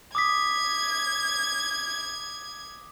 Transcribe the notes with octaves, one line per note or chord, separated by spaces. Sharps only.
D6 D#6 G#6 B6